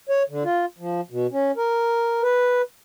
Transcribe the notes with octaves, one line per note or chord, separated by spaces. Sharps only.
C#5
D3
F4
F3
B2
C#4
A#4
B4